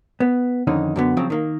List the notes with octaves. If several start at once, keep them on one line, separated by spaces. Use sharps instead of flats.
B3
F2 D3 D#3 C#4 D#4
F#2 D3 B3
C#3 F3 F#3 C4
D#3 A#3